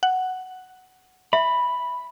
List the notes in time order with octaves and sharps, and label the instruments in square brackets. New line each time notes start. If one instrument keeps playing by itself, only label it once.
[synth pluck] F#5
[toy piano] E5 [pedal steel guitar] B5